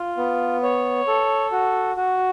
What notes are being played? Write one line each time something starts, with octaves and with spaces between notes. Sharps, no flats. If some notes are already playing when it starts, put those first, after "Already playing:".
Already playing: F4
B3
C#5
A4
F#4
F#4